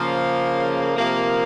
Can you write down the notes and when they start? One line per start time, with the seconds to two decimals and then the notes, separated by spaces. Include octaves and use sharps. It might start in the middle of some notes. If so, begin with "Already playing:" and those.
Already playing: C#3 F3 A#3
0.96 C3 F3 A#3